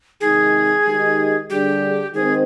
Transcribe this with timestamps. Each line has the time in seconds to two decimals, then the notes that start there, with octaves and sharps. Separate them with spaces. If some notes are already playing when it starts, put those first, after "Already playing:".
0.21 C3 D#3 G#3 D#4 G#4
0.85 D#3 G#3 D#4 G4
1.50 D3 G3 D4 G4 G#4
2.13 D#3 G#3 C4 G#4